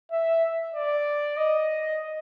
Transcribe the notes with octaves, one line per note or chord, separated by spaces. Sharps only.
E5
D5
D#5